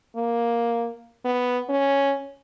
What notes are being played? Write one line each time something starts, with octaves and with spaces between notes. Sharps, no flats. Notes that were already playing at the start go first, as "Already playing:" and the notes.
A#3
B3
C#4